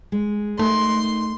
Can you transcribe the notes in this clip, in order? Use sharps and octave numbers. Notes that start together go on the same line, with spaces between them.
G#3
A3 D#4 A#4 C6